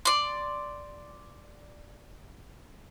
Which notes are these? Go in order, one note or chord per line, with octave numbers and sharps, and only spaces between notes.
D5 C6